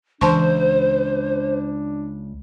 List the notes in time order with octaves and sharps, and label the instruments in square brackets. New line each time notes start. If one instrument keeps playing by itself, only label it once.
[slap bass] C#2 [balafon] E3 A5 C#6 [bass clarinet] D4 [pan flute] C5